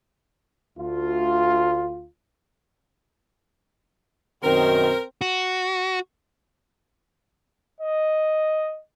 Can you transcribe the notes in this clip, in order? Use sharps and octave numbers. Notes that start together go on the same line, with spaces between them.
D2 F4
F#2 B2 D#3 C4 A#4
F#4
D#5